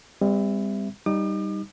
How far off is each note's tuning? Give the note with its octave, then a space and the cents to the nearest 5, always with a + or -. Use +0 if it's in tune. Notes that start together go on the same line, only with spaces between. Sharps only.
G3 +35 C4 -25 E5 +5
G3 +0 D#4 -5 D6 +45